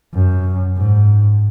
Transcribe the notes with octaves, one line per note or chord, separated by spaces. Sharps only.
F#2
G#2